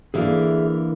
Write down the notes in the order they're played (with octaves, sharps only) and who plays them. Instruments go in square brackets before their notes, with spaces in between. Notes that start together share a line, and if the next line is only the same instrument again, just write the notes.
[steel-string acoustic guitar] D3 E3 A#3 [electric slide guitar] G#4 E5